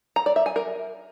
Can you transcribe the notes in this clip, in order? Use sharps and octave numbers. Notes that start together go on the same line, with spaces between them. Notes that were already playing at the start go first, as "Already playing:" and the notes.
A#5
D5
E5
G#5
A#4